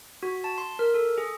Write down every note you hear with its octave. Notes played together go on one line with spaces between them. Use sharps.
F#4
A5
C6
A#4
A4
G#4